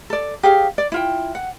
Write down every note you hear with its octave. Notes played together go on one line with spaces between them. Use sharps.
A4 D5
G4 G#4 C#5 F5
D5
E4 F4 G5
F#5